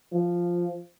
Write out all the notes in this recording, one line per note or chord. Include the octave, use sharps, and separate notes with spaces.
F3